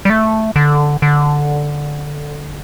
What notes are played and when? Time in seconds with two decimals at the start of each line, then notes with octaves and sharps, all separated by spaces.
0.05 G3
0.10 A3
0.56 D3
1.02 D3